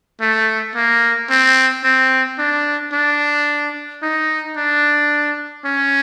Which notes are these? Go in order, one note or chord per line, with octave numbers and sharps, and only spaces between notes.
A3
A#3
C4
C4
D4
D4
D#4
D4
C#4